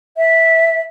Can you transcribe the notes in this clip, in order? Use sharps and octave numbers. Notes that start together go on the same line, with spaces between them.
E5